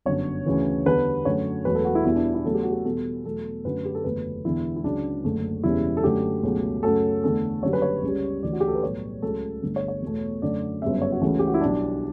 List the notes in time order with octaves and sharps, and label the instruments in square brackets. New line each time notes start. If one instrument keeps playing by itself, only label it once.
[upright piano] G1 F#2 D3 C#5
D2 C#3 E3
E2 D3 G3 B4
F#2 D3 F#3 A3 C#5
E1 E2 B2 F#3 A3 B4
A4
F#4
E4
E2 B2 G3 E4
D4
E4
E2 C#3 F#3 A3 A4
G4
F#4
G4
E2 B2 G3 A4
E2 B2 F#3 A3 A4
F#2 D3 F#3 A3 B4
G4
A4
F#1 E2 D3 F#3 A3 B4
E1 E2 D3 E4
E4
C#2 C#3 F#3 D4
F#1 F#2 D3 A3
E1 E2 C#3 G3 E4
A4
F#2 D3 A3 G4
C#2 B2 F#3 A3
F#2 C#3 F#3 A3 A4
E2 D3 A3 A4
F#1 F#2 D3 G3 C#5
B4
C#5
C#2 C#3 G3
D2 C#3 E3 G3 D5
F#4
G4
A4
B4
B1 A2 G3 C#5
C#2 C#3 F#3 A3 A4
G1 G2 D3 A3
C#5
C#5
E2 B2 A3
F#2 D3 F#3 A3 D5
G1 F#2 C#3 G3 E5
C#5
F#4
C#2 C#3 E3 A3
G4
F#4
E4
B1 B2 G3 D4